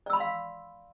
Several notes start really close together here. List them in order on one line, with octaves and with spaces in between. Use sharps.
D5 E6 B5 C6 F5